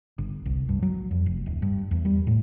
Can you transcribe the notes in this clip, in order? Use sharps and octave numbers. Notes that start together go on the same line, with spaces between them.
G1
C2
G2
F#3
F2
F1
D1
G2
E2
G3
A2